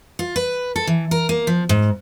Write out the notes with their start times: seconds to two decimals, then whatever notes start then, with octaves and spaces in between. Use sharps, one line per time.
0.19 F4
0.36 B4
0.76 A4
0.87 E3
1.11 A#4
1.29 A#3
1.47 F3
1.69 G#2